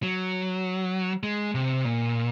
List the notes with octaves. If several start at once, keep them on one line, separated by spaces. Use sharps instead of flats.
F#3
G#3
C3
A#2